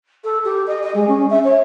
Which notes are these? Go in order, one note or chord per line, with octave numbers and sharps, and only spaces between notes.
A4
G4
D#5
D#5
G#3
C#4
E5
C#5